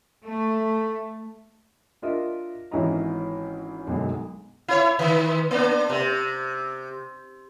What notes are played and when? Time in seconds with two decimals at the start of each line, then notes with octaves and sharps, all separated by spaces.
0.23 A3
2.02 D4 F4 A#4 D#5 E5
2.71 G#1 E3 C#4 E4 D#5 A#5
3.87 B1 F#2 D3 G#3
4.68 E4 C#5
4.99 D#3
5.51 A#3 D4
5.90 C3